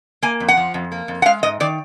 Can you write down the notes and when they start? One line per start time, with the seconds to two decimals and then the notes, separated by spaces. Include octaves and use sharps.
0.23 A#3 G#5
0.40 F2
0.48 F#5
0.57 F3
0.74 F2
0.92 A#3
1.08 F2
1.22 F#5
1.25 G#3 F5
1.43 G#2 D#5
1.60 D#3 D5